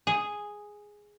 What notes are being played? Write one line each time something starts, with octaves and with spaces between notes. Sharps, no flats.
G#4